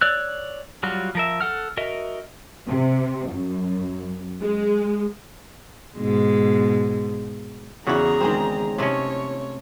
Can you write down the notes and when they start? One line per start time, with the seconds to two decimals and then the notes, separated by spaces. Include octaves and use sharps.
0.01 C#5 D5 E6 F#6
0.83 F#3 G3 F4 F#4
1.15 F3 A#4 E5
1.41 A4 F#5 F6
1.77 F#4 A#4 D#5 E5
2.68 C3
3.31 F#2
4.42 G#3
5.97 G#2 B2 G#3
7.87 E2 C#3 E4 F#4 G#4 A#5
8.21 D#3 G#3 C4
8.78 C3 A3 C#4 E4 C#5 D#5